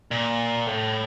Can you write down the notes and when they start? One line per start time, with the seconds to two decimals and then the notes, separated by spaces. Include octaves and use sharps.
0.11 A#2
0.67 A2